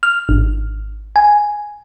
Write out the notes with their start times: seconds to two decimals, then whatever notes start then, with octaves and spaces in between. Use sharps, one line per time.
0.03 F6
0.29 G#1
1.16 G#5